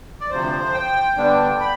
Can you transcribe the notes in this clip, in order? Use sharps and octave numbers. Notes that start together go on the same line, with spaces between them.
D5
D2 C3 F3 C5
G5
G2 D3 G3 B3 D4
B5